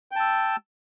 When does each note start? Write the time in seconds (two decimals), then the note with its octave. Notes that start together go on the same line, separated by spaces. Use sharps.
0.12 G5
0.16 A5
0.20 E6